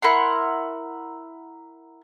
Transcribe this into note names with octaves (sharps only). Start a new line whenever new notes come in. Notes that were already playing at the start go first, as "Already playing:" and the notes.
E4 A#4 F#5 C6